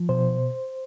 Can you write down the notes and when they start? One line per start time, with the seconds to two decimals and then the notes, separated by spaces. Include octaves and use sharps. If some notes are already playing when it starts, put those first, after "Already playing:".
Already playing: F3
0.09 B2 C5